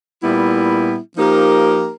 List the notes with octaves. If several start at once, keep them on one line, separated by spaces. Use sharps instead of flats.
A#2 G3 B3 E4
F3 A#3 D#4 G4 A#4